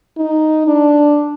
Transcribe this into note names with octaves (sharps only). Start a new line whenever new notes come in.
D#4
D4